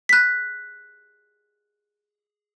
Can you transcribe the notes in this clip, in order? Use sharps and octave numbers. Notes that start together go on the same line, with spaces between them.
F#6 B6